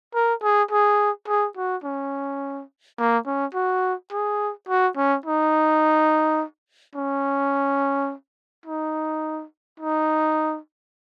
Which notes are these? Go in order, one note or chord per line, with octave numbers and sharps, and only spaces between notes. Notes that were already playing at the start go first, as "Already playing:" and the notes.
A#4
G#4
G#4
G#4
F#4
C#4
A#3
C#4
F#4
G#4
F#4
C#4
D#4
C#4
D#4
D#4